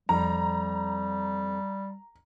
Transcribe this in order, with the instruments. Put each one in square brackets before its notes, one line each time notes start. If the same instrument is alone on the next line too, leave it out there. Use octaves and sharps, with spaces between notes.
[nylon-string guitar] F2 [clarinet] G3 [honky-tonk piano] A#5